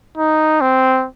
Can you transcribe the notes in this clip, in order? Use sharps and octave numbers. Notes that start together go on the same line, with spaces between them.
D#4
C4